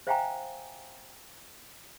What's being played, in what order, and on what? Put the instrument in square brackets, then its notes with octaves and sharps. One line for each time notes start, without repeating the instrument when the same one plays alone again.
[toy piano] C5 E5 F5 G5 G#5 A#5